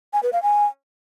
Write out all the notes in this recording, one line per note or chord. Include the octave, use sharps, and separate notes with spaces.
G#5
B4
F5
G#5